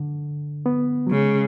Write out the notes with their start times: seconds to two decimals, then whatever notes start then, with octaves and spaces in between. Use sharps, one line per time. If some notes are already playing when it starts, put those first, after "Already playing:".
Already playing: D3
0.66 B3
1.07 F#3
1.11 C#3 G#3